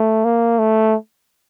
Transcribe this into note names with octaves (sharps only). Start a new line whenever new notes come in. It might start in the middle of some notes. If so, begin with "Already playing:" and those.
Already playing: A3
A#3
A3